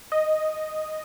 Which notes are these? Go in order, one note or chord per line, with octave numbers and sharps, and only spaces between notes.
D#5